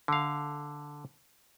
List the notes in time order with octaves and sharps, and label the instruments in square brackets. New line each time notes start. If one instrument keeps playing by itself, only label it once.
[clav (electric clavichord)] D3 F5